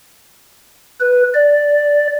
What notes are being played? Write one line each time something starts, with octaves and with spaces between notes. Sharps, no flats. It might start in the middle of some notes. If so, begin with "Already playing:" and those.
B4
D5